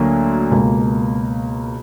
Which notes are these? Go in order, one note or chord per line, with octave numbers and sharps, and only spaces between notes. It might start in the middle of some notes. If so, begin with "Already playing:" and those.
Already playing: D2 D3 F#3 A#3
C#2 B2 A#3